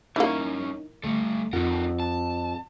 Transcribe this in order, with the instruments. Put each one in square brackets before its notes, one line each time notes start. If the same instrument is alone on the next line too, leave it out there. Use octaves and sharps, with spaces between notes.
[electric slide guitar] G2 C#4 C#5 [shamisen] E3 A#3 [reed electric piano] D#4
[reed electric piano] D2 A3 [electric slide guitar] G3 A4
[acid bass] F2 [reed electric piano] C4 F4 F#5 [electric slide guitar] D#4 A4 A#4
[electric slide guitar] A5